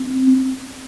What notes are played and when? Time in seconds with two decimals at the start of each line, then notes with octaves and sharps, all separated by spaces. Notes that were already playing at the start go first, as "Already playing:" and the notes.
Already playing: C4